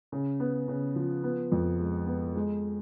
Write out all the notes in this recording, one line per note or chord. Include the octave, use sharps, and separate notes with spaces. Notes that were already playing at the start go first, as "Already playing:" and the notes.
C#3
B3
C#3
F3
B3
F2
G#3
B3
G#3